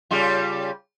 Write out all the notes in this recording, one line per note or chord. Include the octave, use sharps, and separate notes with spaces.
C#3 G3 F4